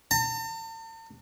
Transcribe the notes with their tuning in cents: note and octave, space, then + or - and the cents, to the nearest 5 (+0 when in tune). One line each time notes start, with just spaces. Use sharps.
A5 +45